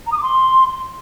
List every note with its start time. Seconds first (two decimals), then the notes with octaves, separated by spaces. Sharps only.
0.06 A#5
0.11 D#6
0.17 D6
0.22 C6